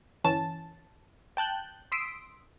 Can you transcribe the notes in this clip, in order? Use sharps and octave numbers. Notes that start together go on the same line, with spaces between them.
G1 E3 C#4 A5
G5 A5 F#6 G6
C6 D#6 E6 B6 C7 D7